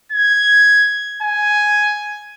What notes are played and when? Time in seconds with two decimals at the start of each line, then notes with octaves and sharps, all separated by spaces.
0.12 G#6
1.23 G#5